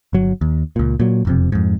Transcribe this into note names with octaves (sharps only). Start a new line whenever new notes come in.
G1 F#3
D#2
C#2 A#2
A#2 F#3
E1 F2 C3
F2 G#2